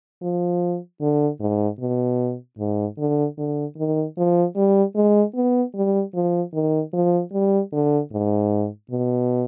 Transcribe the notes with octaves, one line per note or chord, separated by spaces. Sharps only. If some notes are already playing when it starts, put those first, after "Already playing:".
F3
D3
G#2
B2
G#2
D3
D3
D#3
F3
G3
G#3
B3
G3
F3
D#3
F3
G3
D3
G#2
B2